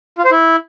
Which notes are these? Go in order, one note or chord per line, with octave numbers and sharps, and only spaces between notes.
F4
C5
E4